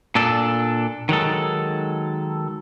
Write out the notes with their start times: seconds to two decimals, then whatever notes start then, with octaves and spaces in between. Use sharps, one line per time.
0.15 A#2 D4 A4
1.09 D#3 F#3 G#3 A4